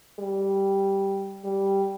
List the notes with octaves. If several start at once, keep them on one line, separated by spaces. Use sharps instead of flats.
G3
G3